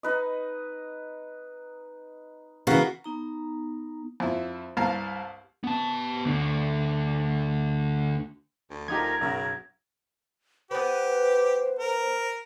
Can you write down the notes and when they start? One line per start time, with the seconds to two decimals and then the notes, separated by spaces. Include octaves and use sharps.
0.03 D#4 B4 D#5
2.67 C#3 E3 A#3 B3 F#4
3.04 B3 D#4 A#5
4.20 F2 E4
4.77 C2 G2 F5 A5 A#5
5.64 B3 A5
6.24 D2 D3
8.70 D2
8.88 F3 D#4 G4 A#4 G#6
9.21 B1 F#2 C#3
10.71 B3 G4 B4 C5
11.79 A#4